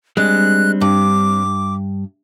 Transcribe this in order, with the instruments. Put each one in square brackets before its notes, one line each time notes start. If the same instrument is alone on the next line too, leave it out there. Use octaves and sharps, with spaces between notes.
[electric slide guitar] G3 C4 D4 [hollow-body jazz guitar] G#3 [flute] F#6
[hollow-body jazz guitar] G2 [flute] D6